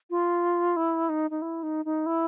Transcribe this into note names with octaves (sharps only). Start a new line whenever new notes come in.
F4
E4
D#4
D#4
E4
D#4
D#4
E4